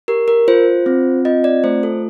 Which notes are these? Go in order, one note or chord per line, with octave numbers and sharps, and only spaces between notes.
G4 A#4
A#4
F4 C5
C4
F4 D#5
D5
A3 C5
A4